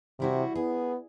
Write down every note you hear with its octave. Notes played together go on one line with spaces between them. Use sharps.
C3 G3 E4 F#4
B3 G#4